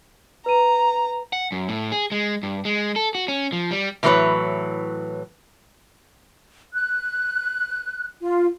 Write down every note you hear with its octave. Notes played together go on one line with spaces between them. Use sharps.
B4 A#5 D#7
F#5
F#2
A2
G#4
G#3
G2
G#3
A4
F#4
C#4
F3
G3
A2 E3 F#3 C#4 B4 C#5
F#6
F4